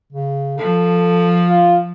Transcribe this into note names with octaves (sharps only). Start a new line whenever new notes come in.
C#3
F3 A4
F4